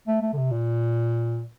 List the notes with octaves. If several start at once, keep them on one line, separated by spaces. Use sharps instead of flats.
A3
A3
D3
C3
A#2